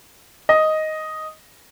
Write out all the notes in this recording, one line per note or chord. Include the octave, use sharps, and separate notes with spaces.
D#5